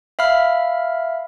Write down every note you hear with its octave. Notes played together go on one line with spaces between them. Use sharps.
E5 F5 B5 F6